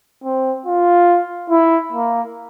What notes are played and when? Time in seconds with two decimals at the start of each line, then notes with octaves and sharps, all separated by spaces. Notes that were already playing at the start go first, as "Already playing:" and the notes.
0.24 C4
0.66 F4
1.50 E4
1.92 A#3